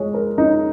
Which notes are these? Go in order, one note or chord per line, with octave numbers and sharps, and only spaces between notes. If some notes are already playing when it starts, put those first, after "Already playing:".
Already playing: G#3 C#5
A#4
D#4